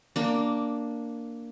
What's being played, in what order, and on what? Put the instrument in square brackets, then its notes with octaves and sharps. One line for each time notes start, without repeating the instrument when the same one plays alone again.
[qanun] A#3 D4